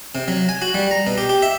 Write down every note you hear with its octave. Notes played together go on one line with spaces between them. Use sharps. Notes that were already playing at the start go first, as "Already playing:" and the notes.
C3
F#3
G#5
F#4
G3
A#5
B2
G4
G4
E5